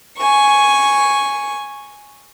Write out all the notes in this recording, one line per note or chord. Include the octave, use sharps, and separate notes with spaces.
G#5 C#6